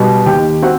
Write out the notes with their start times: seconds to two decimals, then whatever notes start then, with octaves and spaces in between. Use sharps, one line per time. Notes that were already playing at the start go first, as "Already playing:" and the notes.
Already playing: B2 G3
0.26 D#2 G4 G5
0.62 C4 F#4 F#5